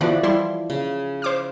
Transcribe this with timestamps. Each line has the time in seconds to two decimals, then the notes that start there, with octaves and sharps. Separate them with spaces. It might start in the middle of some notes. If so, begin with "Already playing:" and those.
0.01 D3 E3 F3 B3 F#4 D5
0.23 G3 E4 C6
0.70 C#3
1.22 C5 D6 F6